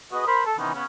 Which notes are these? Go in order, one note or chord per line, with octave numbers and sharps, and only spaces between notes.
F#4 G#4 B4 D#5
A#4 C5 B5
A4
C3 D#3 E3 B3 C#4 D#4
C#3 B3 C#4